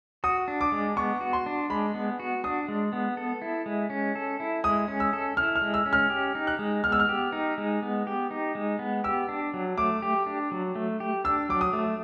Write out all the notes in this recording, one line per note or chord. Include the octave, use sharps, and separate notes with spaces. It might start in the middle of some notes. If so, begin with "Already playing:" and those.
F#4 D#6
D4
D6
G#3
B3 C#6
F#4
C6
D4
G#3 B5
B3
F#4
D4 D#6
G#3
B3
A4
E4
G#3
C#4
A4
E4
G#3 D#6
C#4
E6
A4
E4 F6
F6
G#3
E6
C#4
F6
G4
D#4
F#6
G#3
B3 F6
E6
F6
G4
D#4
G#3
B3
G4
D#4
G#3
B3
G4 E6
D4
F#3
A3 D6
G4
D4
F#3
A3
G4
D4 E6
F#3 D6
D#6
A3